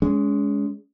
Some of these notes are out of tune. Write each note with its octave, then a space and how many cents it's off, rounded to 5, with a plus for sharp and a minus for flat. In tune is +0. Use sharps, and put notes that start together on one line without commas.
G#3 +0 C#4 +35